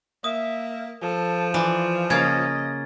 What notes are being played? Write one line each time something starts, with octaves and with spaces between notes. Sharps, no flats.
A#3 E5 D#6
F3 A4
E3 F4 D5
C#3 A#3 D#5 G#6 A6